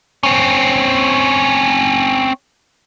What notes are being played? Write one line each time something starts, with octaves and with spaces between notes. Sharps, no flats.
C4 C#4